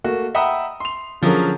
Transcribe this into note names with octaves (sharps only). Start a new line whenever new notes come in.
A3 A#3 F#4
E5 F#5 G5 A#5 B5 D#6
C6 F7
D3 F3 F#3 C#4 G#4 A#4